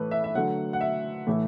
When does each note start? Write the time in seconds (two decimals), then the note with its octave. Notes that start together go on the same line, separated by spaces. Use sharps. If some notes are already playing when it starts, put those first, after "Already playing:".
Already playing: A2 E3 A3 A4 B4
0.11 E5
0.24 E5
0.35 D3 F#3 A3 F#5
0.73 F#5
0.81 E5
1.27 A2 E3 A3